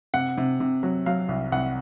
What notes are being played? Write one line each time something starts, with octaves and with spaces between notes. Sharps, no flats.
C3 F#5
C3
C3
F#3
F#3 F5
C2
C2 F#5